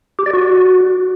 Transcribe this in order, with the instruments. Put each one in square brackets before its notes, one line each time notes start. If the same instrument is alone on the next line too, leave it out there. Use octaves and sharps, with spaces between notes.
[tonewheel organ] G4
D5
F#4